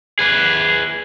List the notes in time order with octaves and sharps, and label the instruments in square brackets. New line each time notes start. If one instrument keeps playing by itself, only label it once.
[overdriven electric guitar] G#4 B4